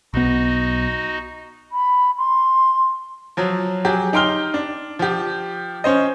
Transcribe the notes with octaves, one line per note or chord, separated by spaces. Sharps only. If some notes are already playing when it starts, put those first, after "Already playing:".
B1 B3 D#4 F#4 D#5
B5
C6
F3 F#3
F#3 G4 G#4
D#4 G4 G5 C6 F6 G7
D4
F3 G4
C#4 C5 D#5